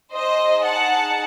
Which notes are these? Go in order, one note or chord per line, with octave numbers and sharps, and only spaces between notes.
D#4 G#4 C5 D#5
F#5 A5